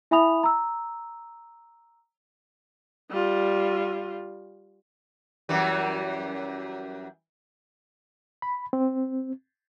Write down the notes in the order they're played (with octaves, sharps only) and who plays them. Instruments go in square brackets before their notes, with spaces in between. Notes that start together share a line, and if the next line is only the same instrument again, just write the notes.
[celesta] E4 E5 G#5 B5 D#6 F7
A#5 E6
[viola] G3 F4
[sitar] F#2 E3 G3
[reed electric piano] B5
C4